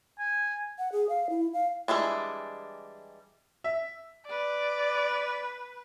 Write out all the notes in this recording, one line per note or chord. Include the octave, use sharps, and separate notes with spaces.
G#5
F#5
G#4
F5
E4
F5
E3 G3 G#3 D4
E5
B4 D5